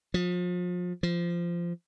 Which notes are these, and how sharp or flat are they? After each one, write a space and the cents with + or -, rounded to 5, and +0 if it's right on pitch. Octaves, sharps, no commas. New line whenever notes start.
F3 +35
F3 -15